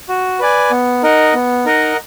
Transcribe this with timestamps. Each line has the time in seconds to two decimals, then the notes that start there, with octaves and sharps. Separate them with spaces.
0.08 F#4
0.39 B4 D5 G#5
0.71 B3
1.03 D#4 A#4 D#5 F#5
1.34 B3
1.65 D#4 A#4 D#5 F#5